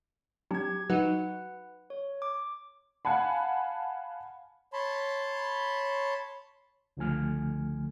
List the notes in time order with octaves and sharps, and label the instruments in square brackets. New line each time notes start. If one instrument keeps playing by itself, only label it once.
[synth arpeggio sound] F#3 C4 D4 [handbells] G4 G#6
[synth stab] F#3 D#4 [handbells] B4 F#5
[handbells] C#5
D6
[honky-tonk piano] F5 F#5 G#5 A5 B5
[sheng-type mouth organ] C#5 A5 B5 C6
[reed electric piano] C#2 D3 F3 A3 G#5 F6